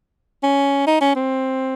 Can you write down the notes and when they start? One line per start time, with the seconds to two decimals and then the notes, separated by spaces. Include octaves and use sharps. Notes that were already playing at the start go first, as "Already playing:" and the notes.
0.43 C#4
0.87 D#4
1.01 C#4
1.15 C4